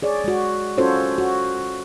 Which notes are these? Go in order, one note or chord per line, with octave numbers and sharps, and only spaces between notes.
G#4 C#5 D5
G#3 F#4
C#4 F4 F#4 A4 C5 C#5
F#4